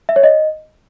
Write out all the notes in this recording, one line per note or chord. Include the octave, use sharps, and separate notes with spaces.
E5
C#5
D#5